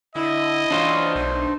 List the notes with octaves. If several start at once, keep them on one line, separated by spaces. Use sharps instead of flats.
D3 E4 D#5
E3 F#3 C#4 D4 F4 C5
B1 B2 A3 D#4